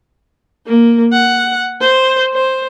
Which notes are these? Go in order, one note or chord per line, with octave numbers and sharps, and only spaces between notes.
A#3
F#5
C5
C5